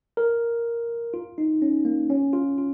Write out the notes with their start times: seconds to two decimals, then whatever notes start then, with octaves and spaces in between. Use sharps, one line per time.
0.17 A#4
1.14 F4
1.38 D#4
1.62 C#4
1.85 A#3
2.10 C#4
2.33 F4
2.58 F4